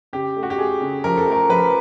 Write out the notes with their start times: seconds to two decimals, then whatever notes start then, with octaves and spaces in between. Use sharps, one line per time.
0.13 C#3 G4
0.36 A3
0.43 F#4
0.50 G4
0.58 A3 G#4
0.81 C#3
1.04 F3 A#4
1.18 A4
1.27 A3 A#4
1.49 F3 B4